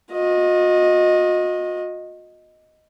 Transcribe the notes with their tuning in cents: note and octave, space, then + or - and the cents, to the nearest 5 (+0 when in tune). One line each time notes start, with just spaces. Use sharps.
F#4 -45 D#5 +0